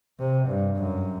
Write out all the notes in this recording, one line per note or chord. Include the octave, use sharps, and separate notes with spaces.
C3
G2
F#2